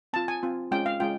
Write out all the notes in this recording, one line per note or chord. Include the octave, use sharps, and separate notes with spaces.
C4 F4 A5
G#5
C4 F4
G#3 C#4 F4 G5
F5
G#3 C#4 F4 G5